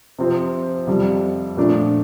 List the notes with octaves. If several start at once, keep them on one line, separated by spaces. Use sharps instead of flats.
C3 F3 C4
F2 C3 G3
A#2 F3 A3 D4